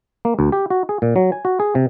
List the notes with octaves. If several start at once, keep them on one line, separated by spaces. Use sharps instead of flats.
A#3
D2
G4
F#4
G#4
A#2
F#3
G#5
F#4
G#4
C3